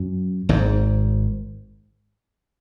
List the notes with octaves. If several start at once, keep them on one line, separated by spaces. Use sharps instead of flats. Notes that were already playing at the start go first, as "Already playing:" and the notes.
Already playing: F#2
G#1 G#2